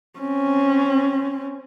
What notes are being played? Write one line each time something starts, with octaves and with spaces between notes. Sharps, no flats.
C4 C#4